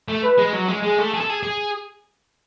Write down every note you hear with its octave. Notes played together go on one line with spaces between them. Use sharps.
A3
B4
G#3
F#3
G#3
G#3 G#4
A3
G#4
A4
G#4
G#4